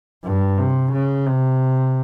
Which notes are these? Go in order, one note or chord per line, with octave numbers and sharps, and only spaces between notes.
G2
C3
C#3
C3